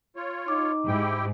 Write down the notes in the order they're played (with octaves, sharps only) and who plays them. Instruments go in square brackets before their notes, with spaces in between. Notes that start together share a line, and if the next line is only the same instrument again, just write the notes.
[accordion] F4 C#5
[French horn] D#4 [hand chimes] D6
[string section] G#2 [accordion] E4 G4 G5